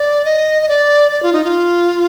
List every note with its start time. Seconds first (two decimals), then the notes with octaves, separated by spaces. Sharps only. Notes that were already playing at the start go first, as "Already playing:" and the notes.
Already playing: D5
0.25 D#5
0.62 D#5
0.69 D5
1.12 D5
1.23 F4
1.33 D#4
1.44 F4